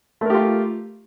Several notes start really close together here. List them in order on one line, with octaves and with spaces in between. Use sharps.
A3 A#4 G4 F4